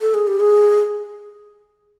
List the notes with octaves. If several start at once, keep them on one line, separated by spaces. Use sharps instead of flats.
A4
G#4
G4
G#4